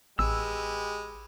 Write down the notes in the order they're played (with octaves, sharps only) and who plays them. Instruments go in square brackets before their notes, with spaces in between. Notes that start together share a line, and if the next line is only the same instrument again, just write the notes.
[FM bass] A1 [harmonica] G#3 G4 B4 [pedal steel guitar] E6